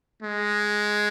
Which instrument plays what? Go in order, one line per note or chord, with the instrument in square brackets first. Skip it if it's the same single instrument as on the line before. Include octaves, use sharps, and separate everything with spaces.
[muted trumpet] G#3